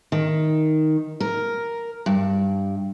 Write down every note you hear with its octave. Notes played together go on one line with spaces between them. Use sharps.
D#3
A#4
G2